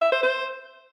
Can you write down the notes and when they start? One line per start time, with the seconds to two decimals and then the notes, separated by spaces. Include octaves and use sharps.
0.01 E5
0.12 C5
0.23 C5